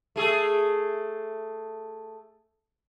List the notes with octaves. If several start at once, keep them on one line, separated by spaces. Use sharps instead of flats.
A3 G#4 A4